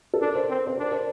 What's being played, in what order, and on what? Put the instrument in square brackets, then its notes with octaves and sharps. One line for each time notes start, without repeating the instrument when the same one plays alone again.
[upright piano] A4
[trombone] D4 [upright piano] A#4
[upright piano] C5
[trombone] C4
[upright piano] C5
[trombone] D4 [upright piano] A#4
[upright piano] C5